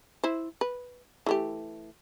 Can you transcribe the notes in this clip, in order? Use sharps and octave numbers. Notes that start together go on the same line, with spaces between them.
E4 C5
B4
E3 A3 G4